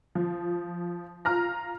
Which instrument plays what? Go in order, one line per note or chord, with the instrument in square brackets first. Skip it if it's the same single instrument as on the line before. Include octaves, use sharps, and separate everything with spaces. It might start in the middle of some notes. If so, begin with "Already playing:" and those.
[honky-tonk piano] F3
F4 A#5 F6 A#6